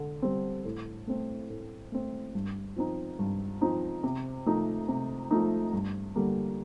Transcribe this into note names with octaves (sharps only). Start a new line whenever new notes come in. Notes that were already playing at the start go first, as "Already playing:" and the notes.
Already playing: D3
G3 C4
A2
A3 C4
A2
A3 C4
G2
F3 C4 D#4
G2
F3 C4 D#4
C3
F3 A3 D#4
C3
F3 A3 D#4
G2
D3 G3 A#3